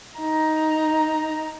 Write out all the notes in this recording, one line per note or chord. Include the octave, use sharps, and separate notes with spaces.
D#4 A#5